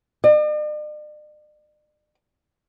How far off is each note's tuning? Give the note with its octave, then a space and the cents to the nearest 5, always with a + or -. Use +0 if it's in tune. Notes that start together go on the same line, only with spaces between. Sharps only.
D5 +45